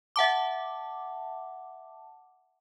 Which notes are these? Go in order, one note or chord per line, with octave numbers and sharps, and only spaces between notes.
E5 F#5 A5 D6